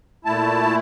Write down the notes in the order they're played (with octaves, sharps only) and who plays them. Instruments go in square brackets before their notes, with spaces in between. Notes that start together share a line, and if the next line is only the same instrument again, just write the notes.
[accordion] A#2 A3 E4 A5